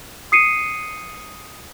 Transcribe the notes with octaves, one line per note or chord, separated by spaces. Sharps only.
D#6 C7 C#7 D#7